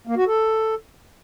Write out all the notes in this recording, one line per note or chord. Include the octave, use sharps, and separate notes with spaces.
A#3
F#4
A4